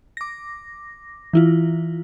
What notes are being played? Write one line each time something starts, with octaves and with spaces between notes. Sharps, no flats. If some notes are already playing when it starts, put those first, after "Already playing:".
D6 A#6
E3 E4 F4